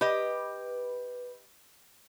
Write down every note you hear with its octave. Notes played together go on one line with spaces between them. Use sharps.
G4 B4 D#5